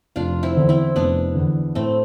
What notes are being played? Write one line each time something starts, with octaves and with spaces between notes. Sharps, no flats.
F1 D4 F4
C4 E4
E2 D3
C4 E4
F1 B3 D4
E2 D3
A2 A3 C4